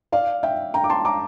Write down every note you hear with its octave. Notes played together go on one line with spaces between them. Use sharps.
D5 F5
E5 G5
G5 A#5
D6
A5 C6
A#5 D6